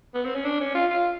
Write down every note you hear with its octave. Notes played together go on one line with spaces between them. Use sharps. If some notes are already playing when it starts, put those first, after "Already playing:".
B3
C4
C#4
D4
C#4
F4
F4